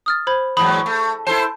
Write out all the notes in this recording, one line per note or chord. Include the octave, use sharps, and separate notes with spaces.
D#6 F6 A6
C5 B5 G#6
E2 G#2 F#3 B5 D#6
A3
E4 A4 C5 A5